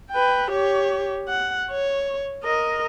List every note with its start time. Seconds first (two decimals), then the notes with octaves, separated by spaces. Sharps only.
0.11 B4 G5
0.51 G4 C#5
1.28 F#5
1.71 C#5
2.44 A#4 D#5